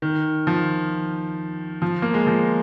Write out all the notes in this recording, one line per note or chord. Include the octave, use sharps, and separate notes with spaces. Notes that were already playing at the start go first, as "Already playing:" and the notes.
D#3
F3
F3
A#3
G#3
F3